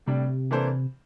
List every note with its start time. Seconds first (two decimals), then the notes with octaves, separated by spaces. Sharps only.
0.06 A2 C3 G3 D4
0.51 E3 A#3 D4 A4 C5